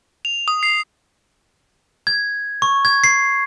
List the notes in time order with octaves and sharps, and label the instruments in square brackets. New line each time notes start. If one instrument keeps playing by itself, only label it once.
[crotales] F7
D#6
C7
[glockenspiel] G#6
C#6
G#6
C7